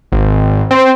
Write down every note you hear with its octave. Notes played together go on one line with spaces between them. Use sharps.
G#1
C4